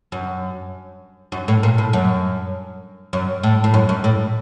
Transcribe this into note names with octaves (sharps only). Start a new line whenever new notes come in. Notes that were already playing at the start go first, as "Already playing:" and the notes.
F#2
F#2
A2
A#2
A2
F#2
F#2
A2
A2
F#2
F#2
A2